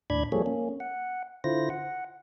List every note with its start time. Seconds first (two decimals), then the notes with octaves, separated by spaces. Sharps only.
0.10 D#2 A2 D4 D5 B5 G#6
0.32 F3 G3 A#3 G#4 A4 C#5
0.46 A#3 C#4
0.80 F#5
1.44 D3 E4 F4 C5 A#6
1.70 F#5